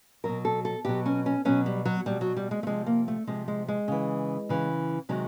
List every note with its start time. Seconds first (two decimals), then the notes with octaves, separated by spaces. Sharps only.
0.24 B2 F#3 A#4
0.45 A4
0.65 A4
0.85 B2 F#3 G4
1.06 C#4
1.26 C#4
1.45 B2 F#3 C#4
1.66 G3
1.85 F#3
2.06 B2 F#3 G3
2.21 F#3
2.37 G3
2.51 G#3
2.63 A3
2.67 C3 F3 G#3
2.86 A#3
3.08 A3
3.27 C3 F3 G#3
3.48 G#3
3.68 G#3
3.88 C#3 E3
4.49 C#3 E3
5.09 C3 D#3 F#3 G#3